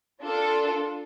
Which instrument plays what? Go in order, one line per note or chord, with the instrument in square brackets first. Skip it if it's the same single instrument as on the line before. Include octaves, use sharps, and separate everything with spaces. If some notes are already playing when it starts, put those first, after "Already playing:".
[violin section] D4 F4 A4